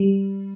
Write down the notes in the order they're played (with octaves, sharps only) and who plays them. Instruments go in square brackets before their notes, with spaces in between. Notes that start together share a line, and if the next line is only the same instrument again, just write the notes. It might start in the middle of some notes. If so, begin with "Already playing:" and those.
Already playing: [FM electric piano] G3